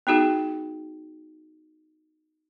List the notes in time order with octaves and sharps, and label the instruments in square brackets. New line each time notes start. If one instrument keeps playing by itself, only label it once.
[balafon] B3 D#4 F#4 G#4